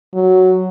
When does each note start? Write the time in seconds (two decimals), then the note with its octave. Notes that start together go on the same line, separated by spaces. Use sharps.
0.14 F#3